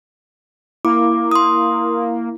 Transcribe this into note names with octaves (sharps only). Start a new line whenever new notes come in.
A#3 E4 D6
C6 D#6